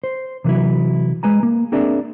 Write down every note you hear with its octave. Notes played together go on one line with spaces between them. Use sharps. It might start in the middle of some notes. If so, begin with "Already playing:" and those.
C5
C3 E3 F#3 E4
G#3 B4 G#5 A#5
A#3
C4 D4 G#4 A#4 D5 E5